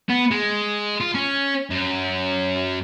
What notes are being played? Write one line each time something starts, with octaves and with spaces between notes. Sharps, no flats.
B3
G#3
F4
C#4
F#2